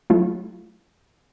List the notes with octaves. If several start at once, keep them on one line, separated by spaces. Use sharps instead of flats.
F#3 A3 E4 F4